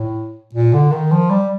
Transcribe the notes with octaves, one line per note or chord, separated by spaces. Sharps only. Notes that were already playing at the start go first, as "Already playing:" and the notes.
Already playing: A2
A#2
D3
D#3
F3
G3